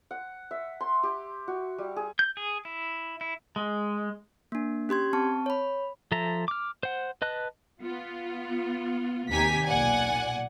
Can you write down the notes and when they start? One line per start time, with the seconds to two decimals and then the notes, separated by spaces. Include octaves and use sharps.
0.11 F#5
0.51 E5
0.81 C6
1.03 G4
1.48 F#4
1.78 G3
1.96 G#4
2.19 G6
2.37 G#4
2.65 E4
3.21 E4
3.56 G#3
4.52 A#3 D4
4.89 C#4 G4 C6 G#6
5.13 C4 A5 C#6
5.46 C#5 B5
6.12 F3 A4 E5 A#5
6.48 D6 F6
6.83 C5 F#5
7.22 B4 D#5 A5 F#6
7.82 B3 F4
9.31 D#2 C3 G4 G#5 A#5 B6
9.67 B1 A#2 D5 F#5 G#5